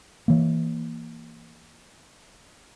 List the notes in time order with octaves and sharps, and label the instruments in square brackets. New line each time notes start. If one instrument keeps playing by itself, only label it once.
[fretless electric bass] E3 A#3